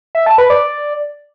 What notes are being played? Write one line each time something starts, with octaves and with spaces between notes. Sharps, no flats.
E5
A5
B4
D5